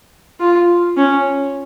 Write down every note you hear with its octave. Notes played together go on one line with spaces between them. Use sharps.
F4
C#4